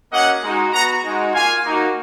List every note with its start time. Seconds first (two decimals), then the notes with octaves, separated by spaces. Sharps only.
0.12 A#3 C#4 F#4 D#5 F#5
0.42 G#3 D#4 F#4
0.73 B3 F#4 F#5 A#5
1.04 G#3 D#4 F#4
1.34 A#3 F4 F5 G#5
1.65 A#3 D#4 F#4